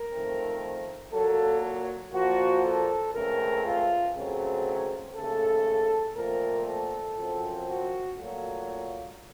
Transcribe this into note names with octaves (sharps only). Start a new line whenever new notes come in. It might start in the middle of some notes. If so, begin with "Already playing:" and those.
Already playing: A#4
F2 D#3 A3 C4
A#2 F#3 A#3 A4
A#2 F3 A#3 F#4
A4
C#2 C#3 A3 C4 A#4
F4
C#2 C#3 F#3 A3 C4
D#2 C#3 A3 A4
A#2 F3 A3 C4 A#4
A4
F#2 F3 C4
F#4
A#2 F#3 A3 F4